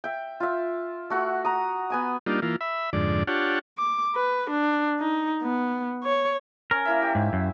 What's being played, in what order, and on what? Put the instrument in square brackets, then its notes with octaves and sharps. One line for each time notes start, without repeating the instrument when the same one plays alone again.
[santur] E5 G5
F4 E5
A3 F#4 F#5 E6
A#5 D#6
B3 G#5 D#6
[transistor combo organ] G3 A#3 D4 D#4 F4
E3 A#3 F4
E5 B5
F2 G#2 D3 D5
D4 F4 G4 C#5 F#5 A5
[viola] D6
B4
D4
D#4
B3
C#5
[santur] C#4 [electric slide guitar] A#4
[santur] A#3 E4 E5
G4
[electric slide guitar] G#2
F#2